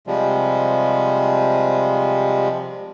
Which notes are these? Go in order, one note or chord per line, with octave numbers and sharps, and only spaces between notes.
C3 F3 G3 G#3